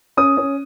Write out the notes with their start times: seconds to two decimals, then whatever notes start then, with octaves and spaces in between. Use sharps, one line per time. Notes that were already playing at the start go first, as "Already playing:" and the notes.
0.17 C#4 D#6
0.37 C#4